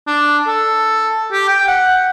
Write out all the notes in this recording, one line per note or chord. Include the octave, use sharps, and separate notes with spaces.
D4
A4
G4
G5
F#5